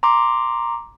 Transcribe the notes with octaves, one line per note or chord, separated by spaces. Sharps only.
A#5 C6 D6